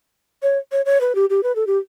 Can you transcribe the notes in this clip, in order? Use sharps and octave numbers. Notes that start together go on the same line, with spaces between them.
C#5
C#5
C#5
B4
G4
G4
B4
A4
G4